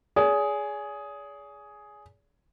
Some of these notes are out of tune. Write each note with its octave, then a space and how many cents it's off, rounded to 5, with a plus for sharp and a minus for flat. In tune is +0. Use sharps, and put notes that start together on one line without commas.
G#4 +5 D5 -45